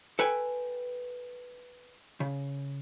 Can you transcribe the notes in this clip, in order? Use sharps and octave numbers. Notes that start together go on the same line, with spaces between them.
A4 B4 G5 G#5
C#3